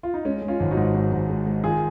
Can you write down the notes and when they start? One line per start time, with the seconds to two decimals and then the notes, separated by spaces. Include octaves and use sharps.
0.03 F4
0.14 D#4
0.25 G#3 C#4
0.42 G#3
0.48 C#4 F4
0.60 G#1
0.71 D#4 F#4
0.77 G#2
0.94 G#2
1.12 G#2
1.29 G#3
1.46 G#3
1.64 D#3 F4 G#4